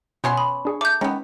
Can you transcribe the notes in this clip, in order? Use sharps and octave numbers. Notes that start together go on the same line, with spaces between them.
B2 B3 C#4 C6
B5 D#6
D4 G#4 C#6
A3 D6 G6
D#3 G#3 B3 C#4